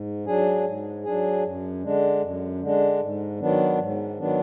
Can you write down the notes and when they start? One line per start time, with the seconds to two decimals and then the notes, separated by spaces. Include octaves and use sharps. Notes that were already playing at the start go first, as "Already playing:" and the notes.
Already playing: G#2
0.26 F#3 D4 G#4
0.65 G#2
1.04 F#3 D4 G#4
1.43 F#2
1.83 D3 G#3 D4
2.22 F#2
2.61 D3 G#3 D4
3.00 G#2
3.39 D#3 F#3 B3 D4
3.78 G#2
4.18 D#3 F#3 B3 D4